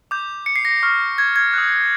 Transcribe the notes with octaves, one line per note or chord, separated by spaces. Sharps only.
D6 G6
C#7
C7
A#6
C#6 F6
G#6
G#6
D#6 F#6